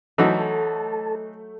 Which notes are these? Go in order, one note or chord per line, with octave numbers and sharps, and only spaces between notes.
E3 F#3 A3 D#4 A4 C5 E5 A5